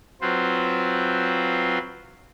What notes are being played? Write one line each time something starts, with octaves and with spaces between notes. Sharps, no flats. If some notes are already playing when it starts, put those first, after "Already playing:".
F#3 C4 F4 B4 C5